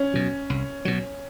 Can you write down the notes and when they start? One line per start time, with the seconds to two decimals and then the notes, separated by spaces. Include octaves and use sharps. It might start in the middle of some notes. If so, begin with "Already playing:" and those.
Already playing: C#4
0.14 B2 F#3
0.50 C2
0.85 B2 F#3